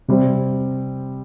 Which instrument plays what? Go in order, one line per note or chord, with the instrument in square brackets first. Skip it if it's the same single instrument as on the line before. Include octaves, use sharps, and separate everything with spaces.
[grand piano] C3 G3 C4